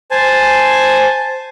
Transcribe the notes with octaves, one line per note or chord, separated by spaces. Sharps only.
C5 G#5 A5